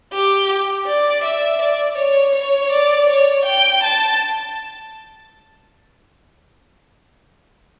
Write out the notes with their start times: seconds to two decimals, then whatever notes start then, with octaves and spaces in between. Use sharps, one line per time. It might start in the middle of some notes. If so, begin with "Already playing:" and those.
0.13 G4
0.87 D5
1.24 E5
1.62 D5
1.98 C#5
2.35 C#5
2.72 D5
3.09 C#5
3.45 G5
3.83 A5